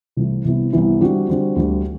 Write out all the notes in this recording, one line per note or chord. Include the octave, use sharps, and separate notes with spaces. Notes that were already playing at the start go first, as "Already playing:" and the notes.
C2 C3 E3 A3 E4
C2 C3 E3 B3 E4
C2 C3 E3 B3 E4
D3 G3 C4 F#4
D3 G3 C4 F#4
D2 D3 G3